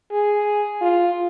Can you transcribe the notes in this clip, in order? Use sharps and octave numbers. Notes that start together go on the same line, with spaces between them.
G#4
F4